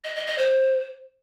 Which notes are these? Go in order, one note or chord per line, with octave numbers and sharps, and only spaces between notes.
D#5
D#5
D#5
C5